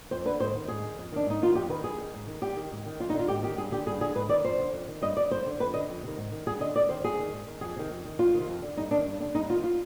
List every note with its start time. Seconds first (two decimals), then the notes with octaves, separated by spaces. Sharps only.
0.11 F2 C5
0.25 D3 B4
0.40 G#2 C5
0.54 D#3
0.68 G#2 G#4
0.84 D#3
0.98 F2
1.12 D#3 D4
1.26 G#2 D#4
1.42 D#3 F4
1.55 F2 G4
1.69 D#3 B4
1.84 G2 G#4
1.98 D#3
2.14 G#2
2.27 D#3
2.41 G2 G4
2.56 D#3
2.72 G#2
2.86 D#3
3.00 F2 F4
3.10 D#4
3.14 D3
3.19 F4
3.28 G#2 G4
3.43 D#3 G4
3.57 G2 G#4
3.71 D3 G4
3.86 G2 G#4
4.01 D3 G#4
4.15 G#2 B4
4.29 D#3 D5
4.44 F2 C5
4.58 D3
4.73 F2
4.88 D#3
5.02 G2 D#5
5.16 D3 D5
5.31 G2 C5
5.46 D3
5.60 F2 B4
5.74 D3 D#5
5.88 F2
6.03 C3 D#3
6.17 G#2
6.31 D#3
6.46 G2 G#4
6.60 D3 D#5
6.75 G#2 D5
6.89 D#3 C5
7.04 G2 G#4
7.19 D#3
7.33 G#2
7.47 D#3
7.61 F2 G#4
7.76 C3 D#3
7.90 F2
8.05 D#3
8.19 F2 F4
8.34 C3 D#3
8.48 F2
8.62 D3
8.77 G2 D#4
8.91 D#3 D4
9.06 G2
9.20 D3 D4
9.34 G2 D#4
9.49 D#3 F4
9.64 F4